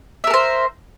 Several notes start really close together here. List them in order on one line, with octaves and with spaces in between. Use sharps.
E5 A#4 A4 C5